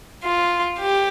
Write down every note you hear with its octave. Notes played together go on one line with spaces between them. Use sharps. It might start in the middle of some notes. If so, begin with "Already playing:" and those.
F4
G4